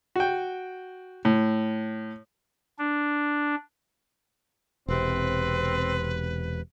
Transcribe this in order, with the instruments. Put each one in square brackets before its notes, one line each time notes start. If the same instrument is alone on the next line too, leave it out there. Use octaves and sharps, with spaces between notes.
[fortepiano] F#4 G5
A2
[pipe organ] D4
[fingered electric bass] E1 C3 [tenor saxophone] C4 [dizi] B4